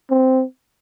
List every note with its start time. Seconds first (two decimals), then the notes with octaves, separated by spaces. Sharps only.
0.11 C4